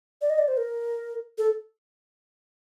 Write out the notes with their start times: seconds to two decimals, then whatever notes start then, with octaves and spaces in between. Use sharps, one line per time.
0.22 D5
0.30 D#5
0.38 D5
0.48 C5
0.57 A#4
1.38 A4